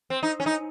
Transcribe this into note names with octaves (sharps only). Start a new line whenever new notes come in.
C4
D#4
C#4
D#4